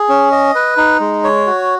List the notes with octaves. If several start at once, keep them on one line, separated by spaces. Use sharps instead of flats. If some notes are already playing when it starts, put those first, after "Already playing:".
Already playing: G#4
C#4
D#5
B4
D#4
G#3
C#5
F#4